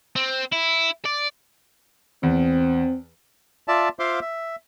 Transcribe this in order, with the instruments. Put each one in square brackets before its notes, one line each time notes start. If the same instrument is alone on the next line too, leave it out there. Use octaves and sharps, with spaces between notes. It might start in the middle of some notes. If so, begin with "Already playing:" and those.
[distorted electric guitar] C4
E4
D5
[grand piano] E2 [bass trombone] C4
[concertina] F4 D5 E5 A5
F4 C5 E5 F5 C6 D6
E5